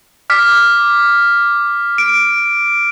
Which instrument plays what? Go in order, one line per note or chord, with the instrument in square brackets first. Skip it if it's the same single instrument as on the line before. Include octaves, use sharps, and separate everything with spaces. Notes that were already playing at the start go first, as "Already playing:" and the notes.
[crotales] D6 F6 B6
D7